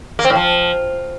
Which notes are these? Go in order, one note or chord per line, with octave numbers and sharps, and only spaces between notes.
A#3
C4
A2
F3